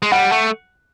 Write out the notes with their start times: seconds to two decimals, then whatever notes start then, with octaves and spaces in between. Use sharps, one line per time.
0.02 G#3
0.12 G3 F#5
0.32 A3